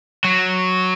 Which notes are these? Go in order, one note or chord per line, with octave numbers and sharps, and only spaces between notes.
F#3